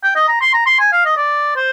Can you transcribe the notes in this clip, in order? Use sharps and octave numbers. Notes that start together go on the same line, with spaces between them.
G5
D#5
A#5
C6
A#5
C6
G#5
F5
D#5
D5
C5